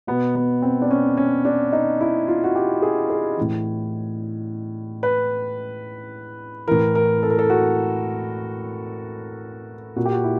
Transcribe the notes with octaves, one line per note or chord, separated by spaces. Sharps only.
B2 B3
B3
C4
D4
C#4
C#4
D4
D#4
E4
F4
F#4
G4
G#4
G#4
A2 E3
B4
A2 E3 A#4
A#4
A4
A#4
A4
F#4
A#2 F#4
G4
F#4
E4